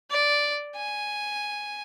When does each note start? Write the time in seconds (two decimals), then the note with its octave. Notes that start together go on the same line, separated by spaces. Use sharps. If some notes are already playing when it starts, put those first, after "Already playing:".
0.11 D5
0.76 G#5